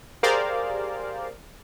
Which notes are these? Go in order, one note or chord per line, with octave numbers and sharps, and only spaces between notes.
G4 G#4 A#4 C5 D5 F5